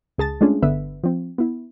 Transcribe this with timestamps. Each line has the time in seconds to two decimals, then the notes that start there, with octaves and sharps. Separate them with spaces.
0.18 C#2 G#4 A5 A6
0.41 G#3 A3 C#4 D4 F4 G#4
0.62 G1 D3 B3 B4 E5
1.04 F3 C4
1.38 B3 E4